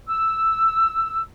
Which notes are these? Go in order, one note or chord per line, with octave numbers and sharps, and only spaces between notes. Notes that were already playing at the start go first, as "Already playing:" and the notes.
E6